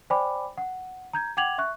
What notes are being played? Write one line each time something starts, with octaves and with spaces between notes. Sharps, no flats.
C5 D5 G5 G#5 B5 D6
F#5
A#5 G6 G#6
F#5 G5 D6 G#6 F7 F#7
E5 C#6 F#6